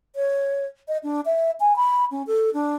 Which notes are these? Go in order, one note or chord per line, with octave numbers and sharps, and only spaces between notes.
C#5
D#5
D4
E5
G#5
B5
C#4
A4
D4